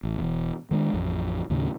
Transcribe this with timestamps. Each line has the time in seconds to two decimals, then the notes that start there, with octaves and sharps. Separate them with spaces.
0.03 A1
0.18 E1 E2
0.71 D#3 G#3 A#3 D4
0.94 A1 F2
1.50 D#2 A2 C#3